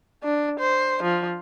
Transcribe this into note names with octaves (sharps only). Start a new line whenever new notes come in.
D4
C5
F3